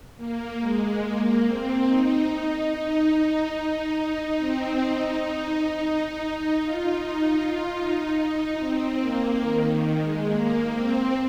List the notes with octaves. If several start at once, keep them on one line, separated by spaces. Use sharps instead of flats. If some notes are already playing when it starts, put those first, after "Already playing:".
A#3
G#3
A#3
C4
D#4
D#4
C4
D#4
D#4
D#4
D#4
D#4
F4
D#4
F4
D#4
D#4
C4
A#3
D#3
D#3
G#3
A#3
C4